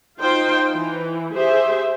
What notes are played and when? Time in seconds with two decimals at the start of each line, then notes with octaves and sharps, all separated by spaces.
0.20 D#4 F4 C5 G5 C6
0.71 E3
1.35 G4 G#4 C5 E5